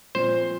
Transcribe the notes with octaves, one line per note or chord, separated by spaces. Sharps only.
A#2 F3 C4 C5